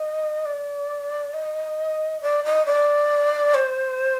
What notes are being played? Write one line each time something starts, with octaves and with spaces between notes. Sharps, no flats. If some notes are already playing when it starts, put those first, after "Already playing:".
Already playing: D#5
D5
D#5
D5
D#5
D5
C5